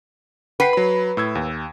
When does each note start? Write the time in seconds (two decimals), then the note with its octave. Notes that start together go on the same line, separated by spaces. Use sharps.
0.60 B4 F#5 G5 C7
0.73 F#3 B5
1.17 A2 E6 G#6
1.35 D#2